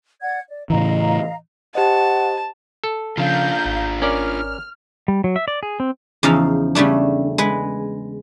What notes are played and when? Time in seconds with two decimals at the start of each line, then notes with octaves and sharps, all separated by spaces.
0.22 D5 F#5 G#6
0.49 D5
0.70 A2 C#3 E3 D#5 F5 A#5
1.75 G4 C5 D#5 F#5 A5
2.84 A4
3.18 C#3 F3 C#4 D4 F4 F5 A#5 G6
3.66 G#1
4.02 C#4 A#4 D5 F6
5.08 G3
5.24 F#3
5.36 E5
5.48 D5
5.63 G#4
5.80 C4
6.23 E2 C#3 F3 D#4 F5
6.75 C#3 G3 A3 D4
7.38 G#3 B4